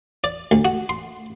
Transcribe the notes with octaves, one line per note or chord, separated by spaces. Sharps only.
D5
D2
F#4
C6